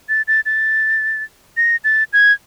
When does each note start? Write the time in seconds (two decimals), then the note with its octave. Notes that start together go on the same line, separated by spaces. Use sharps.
0.09 A6
0.28 A6
0.46 A6
1.57 A#6
1.84 A6
2.13 G#6